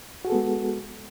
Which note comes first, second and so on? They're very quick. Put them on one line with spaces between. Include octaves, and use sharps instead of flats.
F#4 G#4 A4 B3 G#3